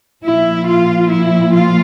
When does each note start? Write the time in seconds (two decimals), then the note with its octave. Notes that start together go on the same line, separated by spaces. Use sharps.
0.25 A#2 F3 E4
0.67 F4
1.10 E4
1.53 F4